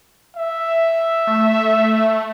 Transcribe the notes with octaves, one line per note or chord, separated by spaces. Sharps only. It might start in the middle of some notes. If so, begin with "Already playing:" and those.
E5
A3